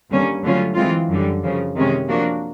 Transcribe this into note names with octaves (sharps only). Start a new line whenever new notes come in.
G2 D3 G3 A#3 C#4
D3 F#3 A3 C#4 F4
E3 G#3 C4 F4
F#2 D3 G3
F#2 C#3 F3
C3 D#3 G#3 C#4
F3 A#3 D4 F#4